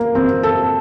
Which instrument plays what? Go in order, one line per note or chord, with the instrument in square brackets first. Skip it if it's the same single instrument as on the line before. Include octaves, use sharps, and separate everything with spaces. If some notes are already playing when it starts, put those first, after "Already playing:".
Already playing: [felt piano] A#3
C4
A4